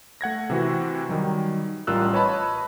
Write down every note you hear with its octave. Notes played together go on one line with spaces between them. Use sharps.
A3 F#5 G#6 A#6
C3 E3 F#4
D#3 F#3 G3
A1 G3 F4 A#4 E6 F#6
B4 C#5 D#5 A5 B5